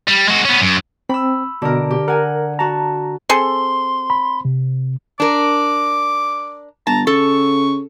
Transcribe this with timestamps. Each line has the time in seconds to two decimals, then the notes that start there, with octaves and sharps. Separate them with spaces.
0.08 G3
0.28 G#3 F#4
0.45 B3 C#4
0.61 F#2
1.09 C4 B5 E6
1.62 B2 D3 A#4
1.91 G4
2.08 A#4 F#5 G#5
2.59 F#4 A5 A#5
3.29 C4 G#4 A4 C6
4.10 B5
4.45 C3
5.20 D4 A#4 D6
6.87 G1 A5 A#5
7.07 C#3 A4 C#6